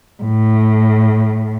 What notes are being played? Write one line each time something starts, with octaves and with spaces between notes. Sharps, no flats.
A2